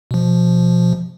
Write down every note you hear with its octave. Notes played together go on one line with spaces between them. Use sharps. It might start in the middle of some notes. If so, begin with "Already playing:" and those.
B2 F3